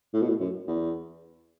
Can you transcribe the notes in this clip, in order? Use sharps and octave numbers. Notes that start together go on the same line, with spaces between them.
A2
B2
A2
F#2
E2